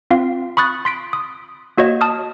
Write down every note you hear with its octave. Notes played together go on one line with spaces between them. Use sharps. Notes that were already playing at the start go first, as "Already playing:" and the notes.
C4 F4 F5
B5 C#6 D#6 F#6 A6
C6 B6 D7
D#6
A#3 F#4 C#5 D#5
A5 D#6 F6